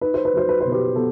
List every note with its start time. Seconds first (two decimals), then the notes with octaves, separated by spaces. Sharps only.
0.01 D#4 B4
0.14 C5
0.25 B4
0.33 F#3 C5
0.49 B4
0.60 B2 C5
0.72 G4 B4
0.95 B3 A4